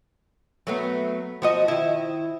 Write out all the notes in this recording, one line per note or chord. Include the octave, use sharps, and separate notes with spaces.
F#3 A3 B3
F3 F#4 D#5
D#3 E4